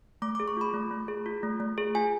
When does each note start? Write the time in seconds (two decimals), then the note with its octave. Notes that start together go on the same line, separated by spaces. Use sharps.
0.22 A3 D6
0.35 G#4 D6
0.48 C#6
0.57 F4 B5
0.74 A3
0.91 A3
1.08 G#4
1.26 F4
1.43 A3
1.60 A3
1.78 G#4
1.95 F4 G#5